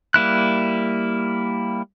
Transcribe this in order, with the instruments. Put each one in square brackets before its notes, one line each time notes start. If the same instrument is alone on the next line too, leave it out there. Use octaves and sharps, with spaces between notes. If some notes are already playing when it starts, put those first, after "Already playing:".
[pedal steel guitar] G3 A#3 E4 F#6